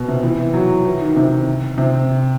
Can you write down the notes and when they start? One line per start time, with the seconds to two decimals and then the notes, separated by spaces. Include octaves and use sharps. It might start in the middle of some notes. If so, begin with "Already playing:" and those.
Already playing: B2
0.08 C3
0.23 E3
0.54 F#3
0.85 E3
1.01 D#3
1.16 C3
1.78 C3